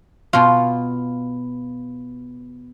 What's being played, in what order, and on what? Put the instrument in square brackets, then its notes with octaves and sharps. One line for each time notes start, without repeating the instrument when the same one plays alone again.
[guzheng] B2 F4